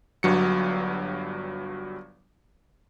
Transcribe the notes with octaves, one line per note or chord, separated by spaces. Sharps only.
G1 G2 F#3 C#7